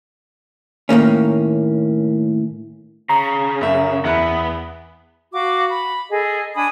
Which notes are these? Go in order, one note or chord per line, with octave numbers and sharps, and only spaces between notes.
A2 D#3 A#3 C#4
C#3 A#5
F#2 E5
E2 B3 E4 F#6
F#4 F5 D6
B5
G#4 A4 D#5
D4 G#5 B5 D#6